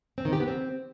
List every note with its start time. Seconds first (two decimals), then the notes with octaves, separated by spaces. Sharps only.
0.18 C4
0.25 D#3
0.33 G4
0.40 B3
0.48 C4